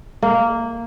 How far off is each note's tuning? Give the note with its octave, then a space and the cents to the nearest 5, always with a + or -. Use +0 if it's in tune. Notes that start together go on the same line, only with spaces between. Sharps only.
A#3 -10